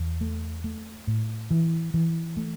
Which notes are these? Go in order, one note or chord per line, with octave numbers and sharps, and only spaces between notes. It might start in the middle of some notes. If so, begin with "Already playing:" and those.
Already playing: E2
A3
A3
A2
E3
E3
A3